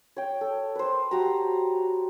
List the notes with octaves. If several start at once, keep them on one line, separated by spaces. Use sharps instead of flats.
C#5 G5
A4
B4 C5
F#4 G4 A5 A#5